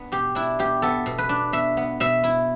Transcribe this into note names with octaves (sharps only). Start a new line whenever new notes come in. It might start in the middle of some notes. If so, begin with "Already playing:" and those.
Already playing: B3 D4
B2 G4
D4 E4
B2 G4
B3 A4
B2
B4
D4
B2 E5
B3
B2 E5
E4